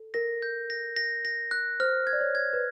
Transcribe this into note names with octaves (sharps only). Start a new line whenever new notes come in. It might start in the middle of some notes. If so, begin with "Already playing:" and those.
Already playing: A4
A#4 A#6
G6
A#6
A#6
A#6
F#6
C5 F6
G#6
D5
C#5
G#6
B4